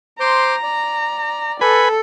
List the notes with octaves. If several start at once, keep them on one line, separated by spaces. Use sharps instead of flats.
C5 A#5 C6 D6
D5
A4 B4 G#5 B5